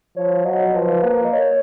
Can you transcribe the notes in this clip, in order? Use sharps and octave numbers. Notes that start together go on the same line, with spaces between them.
F3 C#5
F#3 D#5
F3 B4
A#3
D#5
C#5